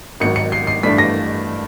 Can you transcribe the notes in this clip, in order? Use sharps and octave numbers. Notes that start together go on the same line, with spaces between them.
G#1 G#2 D#3 F#3 C#7
C#7
C7
C7
G2 E3 A3 D4 B6
A#6